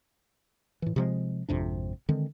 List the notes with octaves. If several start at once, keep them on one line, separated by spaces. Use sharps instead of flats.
A2 E3
C3 F3 G#3
G#1 F2 C3 D4
D3 D#3 G#3 C4